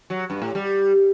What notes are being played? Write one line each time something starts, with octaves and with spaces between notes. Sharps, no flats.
F#3
G2
A2
G3